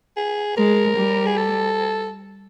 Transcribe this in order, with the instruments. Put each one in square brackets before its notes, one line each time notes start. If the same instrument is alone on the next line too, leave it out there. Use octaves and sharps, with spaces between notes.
[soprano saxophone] G#4
[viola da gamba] G#3 [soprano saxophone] A#4
[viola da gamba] G3
[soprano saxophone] G#4
A4